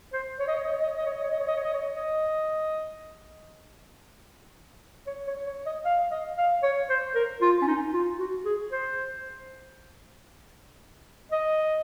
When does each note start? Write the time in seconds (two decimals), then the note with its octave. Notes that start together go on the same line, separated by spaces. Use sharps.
0.13 C5
0.40 C#5
0.47 D#5
0.56 C#5
0.64 D#5
0.72 C#5
0.81 D#5
0.89 C#5
0.97 D#5
1.06 C#5
1.15 D#5
1.23 C#5
1.31 D#5
1.40 C#5
1.48 D#5
1.56 C#5
1.64 D#5
1.73 C#5
1.95 D#5
5.07 C#5
5.27 C#5
5.46 C#5
5.66 D#5
5.85 F5
6.11 D#5
6.38 F5
6.63 C#5
6.90 C5
7.15 A#4
7.42 F4
7.62 C#4
7.67 D#4
7.93 F4
8.19 F#4
8.45 G#4
8.72 C5
11.32 D#5